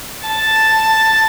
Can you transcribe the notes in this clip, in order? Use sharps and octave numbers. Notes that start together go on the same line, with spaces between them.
A5